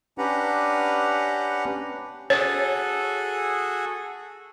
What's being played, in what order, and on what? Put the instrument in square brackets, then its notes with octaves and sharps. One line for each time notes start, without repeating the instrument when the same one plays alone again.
[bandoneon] C#4 D4 G4 B4 F#5 A#5
[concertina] F#4 G#4 A4 [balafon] C#5